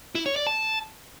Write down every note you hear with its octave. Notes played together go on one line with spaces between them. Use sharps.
E4
C#5
D5
A5